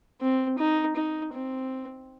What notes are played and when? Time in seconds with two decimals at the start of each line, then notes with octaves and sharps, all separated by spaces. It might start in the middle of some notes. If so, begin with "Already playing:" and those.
0.21 C4
0.58 D#4
0.96 D#4
1.33 C4